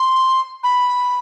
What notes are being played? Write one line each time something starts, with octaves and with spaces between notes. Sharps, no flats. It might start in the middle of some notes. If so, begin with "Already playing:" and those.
Already playing: C6
B5